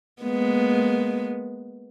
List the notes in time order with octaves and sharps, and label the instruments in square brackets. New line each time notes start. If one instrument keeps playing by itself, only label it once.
[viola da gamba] G#3 A#3 B3